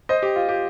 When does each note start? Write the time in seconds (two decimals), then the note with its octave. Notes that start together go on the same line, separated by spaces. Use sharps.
0.09 C5 D#5
0.23 G4
0.36 F4
0.49 G4